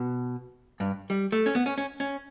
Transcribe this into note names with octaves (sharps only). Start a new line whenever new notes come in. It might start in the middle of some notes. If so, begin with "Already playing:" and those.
Already playing: B2
G2
G3
A3
C#4
B3
C#4
C#4
C#4